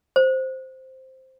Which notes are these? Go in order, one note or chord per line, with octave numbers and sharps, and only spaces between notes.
C5